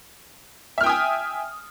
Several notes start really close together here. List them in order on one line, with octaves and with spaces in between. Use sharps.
E5 F6 G5 D#6 G#5